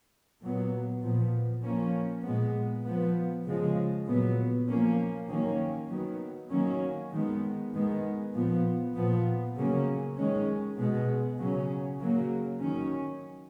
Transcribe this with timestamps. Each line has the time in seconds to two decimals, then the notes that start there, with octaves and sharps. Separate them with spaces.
0.41 A#2 F#3 B3
1.02 A#2 F3 B3
1.62 F3 A#3 C#4
2.24 A#2 G#3 B3
2.85 F3 B3
3.45 C#3 F3 G#3
4.06 A#2 F#3 B3
4.68 F3 A#3 C#4
5.28 D#3 F#3 A#3 C#4
5.89 D#3 F#3 B3
6.50 D#3 F#3 A#3 C#4
7.12 D#3 G#3 B3
7.73 D#3 G#3 B3
8.34 A#2 F3 B3
8.95 A#2 F3 B3
9.56 C#3 F#3 A#3 C#4
10.17 D#3 G#3 C#4
10.77 B2 G#3 B3
11.38 C#3 F#3 C#4
12.00 C#3 F#3 A#3
12.60 D#3 F#3 C#4